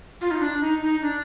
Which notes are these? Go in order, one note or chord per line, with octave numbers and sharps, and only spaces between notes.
F4
D#4
D4
D#4
D#4
D4